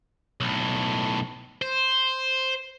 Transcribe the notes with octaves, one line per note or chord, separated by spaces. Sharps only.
B1 A2
C5